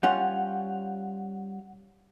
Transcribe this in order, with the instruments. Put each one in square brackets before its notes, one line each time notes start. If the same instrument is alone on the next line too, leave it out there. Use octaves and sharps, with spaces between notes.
[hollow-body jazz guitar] G3 C#4 F4 [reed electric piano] F#5